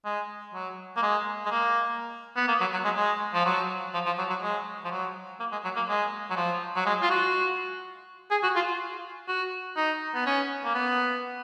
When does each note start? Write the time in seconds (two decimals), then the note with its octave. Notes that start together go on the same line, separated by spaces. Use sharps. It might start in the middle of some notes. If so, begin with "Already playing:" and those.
0.05 G#3
0.54 F#3
0.97 A#3
1.02 G#3
1.46 G#3
1.51 A#3
2.37 B3
2.48 A#3
2.60 F#3
2.73 F#3
2.84 G#3
2.97 G#3
3.34 F3
3.45 F#3
3.94 F3
4.06 F3
4.18 F#3
4.30 F#3
4.42 G#3
4.85 F3
4.91 F#3
5.40 A#3
5.52 G#3
5.64 F#3
5.76 A#3
5.89 G#3
6.30 F#3
6.36 F3
6.76 F#3
6.86 G#3
7.02 F4
7.10 F#4
8.31 G#4
8.43 F#4
8.56 F4
9.28 F#4
9.76 D#4
10.15 B3
10.26 C#4
10.64 A#3
10.74 B3